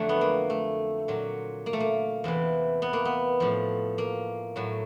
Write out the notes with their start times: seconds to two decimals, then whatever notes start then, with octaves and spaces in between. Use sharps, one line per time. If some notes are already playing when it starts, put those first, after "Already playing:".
Already playing: F2 D3 F#3 A3
0.09 B3
0.21 A#3
0.50 A3
1.08 A#2 F#3
1.66 A#3
1.73 A3
1.80 A#3
2.24 E2 C3 E3
2.82 B3
2.93 A#3
3.05 B3
3.40 A2 F3
3.98 A#3
4.56 A2 F#3